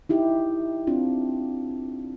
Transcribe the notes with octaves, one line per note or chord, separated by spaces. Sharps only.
D#4 E4 G4
C4 D4 F4